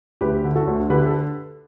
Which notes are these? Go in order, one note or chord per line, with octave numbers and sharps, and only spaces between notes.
D2 G4 B4
D3
F#4 A4
D2
D3 G4 B4
A4